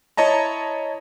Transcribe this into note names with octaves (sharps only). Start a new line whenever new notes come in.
E4 C#5 D#5 A5 A#5